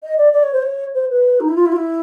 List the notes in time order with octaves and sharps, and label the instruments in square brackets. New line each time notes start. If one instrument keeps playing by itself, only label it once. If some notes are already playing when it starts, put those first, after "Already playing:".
[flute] D#5
D5
D5
C#5
C5
C#5
C5
B4
D#4
E4
F4
E4
F4
E4